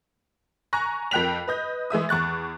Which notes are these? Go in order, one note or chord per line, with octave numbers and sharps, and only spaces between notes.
G#5 A#5 C#6 F#6 A#6
F2 A#4 G5 F#6 B6 F7
B4 D#5 G6
E3 G#3 E5 D#6
E2 C#6 F#6 A6